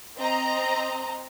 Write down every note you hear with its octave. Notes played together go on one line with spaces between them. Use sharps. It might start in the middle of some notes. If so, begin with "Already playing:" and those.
C4 D#5 A#5